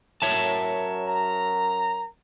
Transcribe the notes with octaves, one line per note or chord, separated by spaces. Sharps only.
F#2 F#3 A#4 C#5 E5 A5
A#5